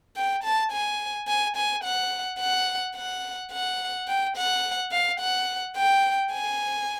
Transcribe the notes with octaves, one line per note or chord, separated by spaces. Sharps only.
G5
A5
G#5
G#5
G#5
F#5
F#5
F#5
F#5
G5
F#5
F5
F#5
G5
G#5